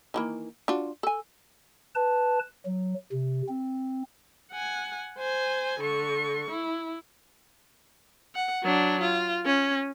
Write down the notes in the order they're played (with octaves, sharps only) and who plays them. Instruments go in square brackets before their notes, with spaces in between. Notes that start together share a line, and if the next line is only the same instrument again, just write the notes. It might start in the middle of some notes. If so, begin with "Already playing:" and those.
[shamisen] D#3 E3 A#3
D4 F4 F#4
A4 G#5
[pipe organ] B4 A5
F#3
C3
C4
[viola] F#5 G#5
C5 G#5
D3 C#6
E4
F#5
F#3 D4
F4
C#4